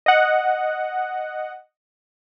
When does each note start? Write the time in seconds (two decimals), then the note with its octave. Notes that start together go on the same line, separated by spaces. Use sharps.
0.06 D#5 F#5